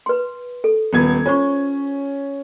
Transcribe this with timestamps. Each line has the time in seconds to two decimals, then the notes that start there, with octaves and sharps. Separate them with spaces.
0.06 B4 C6
0.64 A4
0.93 D#1 B3 G#6
1.25 C#4 F4 C5 C#6